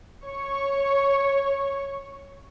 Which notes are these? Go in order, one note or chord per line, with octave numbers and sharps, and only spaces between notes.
C#5 C#6